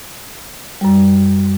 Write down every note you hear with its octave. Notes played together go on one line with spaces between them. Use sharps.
F#2 G3